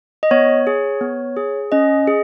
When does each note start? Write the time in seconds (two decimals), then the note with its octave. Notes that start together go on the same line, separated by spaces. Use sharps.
0.23 D#5
0.31 B3 C#5
0.67 G#4
1.01 B3
1.37 G#4
1.72 C#4 D#5
2.07 G#4